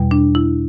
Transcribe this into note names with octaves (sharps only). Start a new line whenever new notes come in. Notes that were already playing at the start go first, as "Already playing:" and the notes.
Already playing: E2 B2 G3
D4
E4